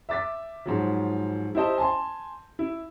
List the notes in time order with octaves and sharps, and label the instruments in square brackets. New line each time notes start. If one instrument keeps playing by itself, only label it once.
[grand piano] E5 D6 A6 B6
G#2 F3 F#3
E4 G4 C5 D#5 A5
G#5 A5 C6
E4